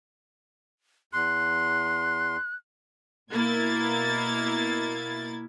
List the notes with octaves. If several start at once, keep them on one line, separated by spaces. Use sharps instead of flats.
E2 C6 F#6
B2 A#3 E4 G#6 A6